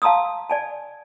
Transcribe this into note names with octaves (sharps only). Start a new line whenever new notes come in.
F5 A5 A#5 C6 D#6 E6
D5 G#5 A5